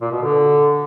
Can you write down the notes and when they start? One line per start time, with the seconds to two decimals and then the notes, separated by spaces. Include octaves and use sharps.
0.02 A#2
0.12 B2
0.23 D3